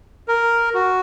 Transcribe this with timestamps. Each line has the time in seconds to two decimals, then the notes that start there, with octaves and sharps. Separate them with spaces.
0.28 A#4
0.74 F#4